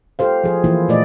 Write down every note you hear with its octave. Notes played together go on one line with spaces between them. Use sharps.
F4 G4 A4 C5 F5
F3 G#4
E3 F3 A#3 E4 F4
A#2 A3 D5 D#5